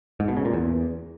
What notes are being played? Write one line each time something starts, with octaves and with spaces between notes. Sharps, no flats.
G#2
B2
C#3
A#2
E2